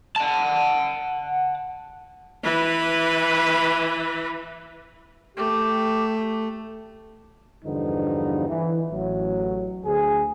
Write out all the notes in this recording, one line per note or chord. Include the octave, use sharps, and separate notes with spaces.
F#5 A5
E3 B4
A3 G4
E2 G2 D3 F3 B3 D#4
E3
A1 F#3
D2 G#4